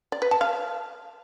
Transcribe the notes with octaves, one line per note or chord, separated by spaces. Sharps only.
D5
B4
A5
F5